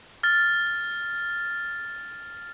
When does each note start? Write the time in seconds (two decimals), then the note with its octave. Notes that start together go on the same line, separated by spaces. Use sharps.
0.23 F6 A6